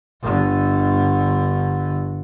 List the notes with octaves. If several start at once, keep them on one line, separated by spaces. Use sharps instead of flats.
G1 D3